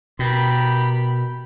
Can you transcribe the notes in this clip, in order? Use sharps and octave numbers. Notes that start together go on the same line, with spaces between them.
B2 G4 A#4 B5